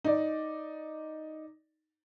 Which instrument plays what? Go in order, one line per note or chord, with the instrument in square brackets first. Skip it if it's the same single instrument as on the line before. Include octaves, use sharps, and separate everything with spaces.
[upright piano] D#4 D5